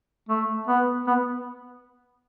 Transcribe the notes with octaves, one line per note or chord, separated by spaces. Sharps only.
A3
B3
B3